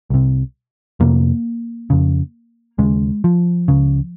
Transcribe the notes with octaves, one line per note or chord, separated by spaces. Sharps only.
C2 C3
F2 C3 A#3
F2 C#3
D#2 C#3 G#3
F3
C#2 C#3